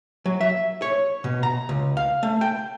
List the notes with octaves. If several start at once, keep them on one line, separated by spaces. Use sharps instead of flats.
F#3
E5
C#5
B2
A#5
C#2
F5
A3
G5